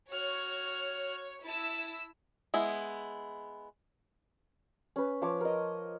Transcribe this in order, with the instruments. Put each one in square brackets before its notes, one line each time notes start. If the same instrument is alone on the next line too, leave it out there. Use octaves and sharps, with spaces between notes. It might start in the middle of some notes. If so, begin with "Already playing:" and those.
[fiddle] F#4 F6 [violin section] C#5
[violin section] E4 E6 [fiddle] A5
[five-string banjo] G#3 B3 E4
[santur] C#4 B4
F3 C#5 D6
A#4 D#5